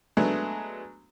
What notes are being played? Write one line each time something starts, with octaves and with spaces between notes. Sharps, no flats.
F#3 G#3 A3 B3 D4